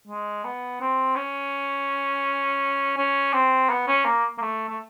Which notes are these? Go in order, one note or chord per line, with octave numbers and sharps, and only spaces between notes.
G#3
B3
C4
C#4
C#4
C4
B3
C#4
A#3
A#3
A3
A3